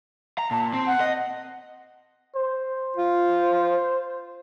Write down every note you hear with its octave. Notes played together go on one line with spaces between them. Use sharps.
A#5
A#2 A5
C4
F#5
D#5
C5
F4